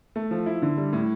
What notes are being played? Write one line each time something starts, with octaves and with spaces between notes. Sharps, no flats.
A3
F3
E4
D3
G3
A2